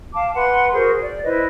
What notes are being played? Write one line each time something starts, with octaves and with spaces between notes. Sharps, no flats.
F5 A5 D6
B4 F#5 C6
F#4 G#4 A#4 C5
D5
E4 B4 C5 D#5